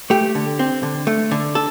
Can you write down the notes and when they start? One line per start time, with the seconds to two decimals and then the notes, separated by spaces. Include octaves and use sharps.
0.10 A3 G4
0.35 D3
0.59 C4
0.83 D3
1.07 A3
1.31 D3
1.55 A4